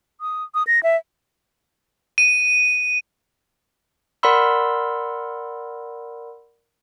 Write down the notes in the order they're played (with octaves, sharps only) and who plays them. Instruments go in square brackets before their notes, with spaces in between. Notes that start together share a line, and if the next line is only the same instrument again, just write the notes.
[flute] D#6
D#6
A#6
E5
[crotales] D#7
[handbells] A#4 D5 F#5 B5 C6 E6